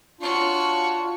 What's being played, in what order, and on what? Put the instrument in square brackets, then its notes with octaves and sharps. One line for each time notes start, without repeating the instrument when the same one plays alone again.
[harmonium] D4 F4 [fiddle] F#4 C#5